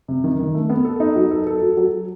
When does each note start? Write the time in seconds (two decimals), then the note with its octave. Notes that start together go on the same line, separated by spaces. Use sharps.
0.08 C3
0.24 D#3
0.39 D#3
0.54 A3
0.70 B3
0.85 A4
1.00 D#4
1.16 F#3
1.31 A4
1.47 A4
1.62 F#3
1.77 F#3